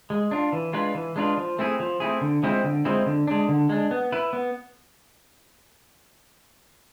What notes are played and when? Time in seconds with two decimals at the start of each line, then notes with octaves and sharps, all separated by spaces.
0.10 G#3
0.31 D4 F4
0.53 E3
0.73 G#3 D4 F4 B4
0.95 E3
1.16 G#3 D4 F4 B4
1.37 F3
1.59 A3 C4 E4 G#4
1.80 F3
2.00 A3 C4 E4 G#4
2.21 D3
2.43 F3 G#3 C4 E4
2.64 D3
2.85 F3 G#3 C4 E4
3.06 D3
3.27 G#3 D4
3.49 D3
3.69 G#3 D4
3.91 B3
4.12 E4 B4
4.33 B3